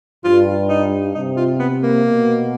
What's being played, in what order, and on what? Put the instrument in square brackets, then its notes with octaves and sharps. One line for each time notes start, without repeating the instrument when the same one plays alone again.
[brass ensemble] G2 [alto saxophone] F4
[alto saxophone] D#4
[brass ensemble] C3 [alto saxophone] D#4
[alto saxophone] F4
B3
A#3
[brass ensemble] B2